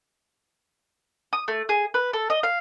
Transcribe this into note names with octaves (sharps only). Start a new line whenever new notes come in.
D#6
A3
G#4
B4
A4
D#5
F5